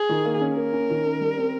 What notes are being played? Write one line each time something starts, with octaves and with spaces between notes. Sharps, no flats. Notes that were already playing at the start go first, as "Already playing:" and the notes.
Already playing: G#4
D#3
A#3
C#4
A#3 A#4
C#4
D#3
C#4
G3
C4